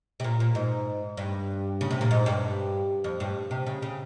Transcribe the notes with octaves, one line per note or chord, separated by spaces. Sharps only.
C3
A#2
A#2
G#2
G2
C#3
C3
A#2
G#2
G2
F2
G2
C3
C#3
C#3